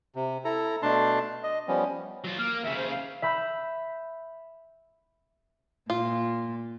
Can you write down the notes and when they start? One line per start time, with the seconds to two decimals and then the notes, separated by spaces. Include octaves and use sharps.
0.15 C3
0.45 E4 A4 A#5
0.82 B2 A3 D4 A5 C6
1.43 D#5
1.68 F3 G3 B3 C#4
2.24 F#3 F4
2.38 A#3 F6
2.63 D#2 C#3 E5
2.77 C5
2.90 F5
3.22 E5 B5 G6
5.90 A#2 F4